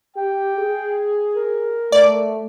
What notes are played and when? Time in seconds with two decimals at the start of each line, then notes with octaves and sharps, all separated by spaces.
0.17 G4 G5
0.58 G#4
1.35 A#4
1.92 A3 D5